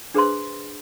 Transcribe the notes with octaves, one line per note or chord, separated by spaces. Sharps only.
D4 G#4 B4 C5 C6